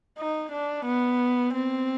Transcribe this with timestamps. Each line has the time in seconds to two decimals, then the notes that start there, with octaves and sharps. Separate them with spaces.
0.18 D#4
0.52 D4
0.86 B3
1.54 C4